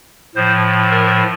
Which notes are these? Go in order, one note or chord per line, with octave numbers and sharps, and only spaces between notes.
A2 F3 C5
A#4